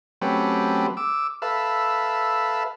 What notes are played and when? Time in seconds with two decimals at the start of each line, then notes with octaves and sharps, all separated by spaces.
0.22 F#3 A3 C4 C#4 G4 B4
0.97 D6 E6
1.42 A4 B4 E5 F5